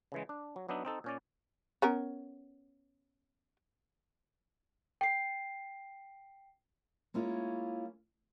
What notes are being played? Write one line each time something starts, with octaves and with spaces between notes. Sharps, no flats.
C#3 E3 G#3
D4
F#3
F#3 B3 D4 D#4 E5
C4 D#4 A4
A#2 C#4 D5
B3 C#4 A#4
G5 C7
G#3 A#3 C#4 E4 F4